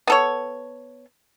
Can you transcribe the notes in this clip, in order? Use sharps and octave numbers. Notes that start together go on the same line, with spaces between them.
B3 A4 C#5